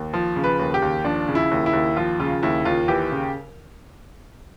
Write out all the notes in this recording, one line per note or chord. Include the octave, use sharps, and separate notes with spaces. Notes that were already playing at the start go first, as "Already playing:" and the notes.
Already playing: D#2
F3
C#3
B4
D#2
G4
D#2
F3 D4
C#3
E4
D#2
E4
D#2
F3 F4
C#3 F4
D#2 E4
D#2 F4
E3 G4
C#3